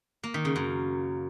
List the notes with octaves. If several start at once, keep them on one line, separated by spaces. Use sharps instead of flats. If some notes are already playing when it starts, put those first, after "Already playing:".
A#3
D#3
C#3
F#2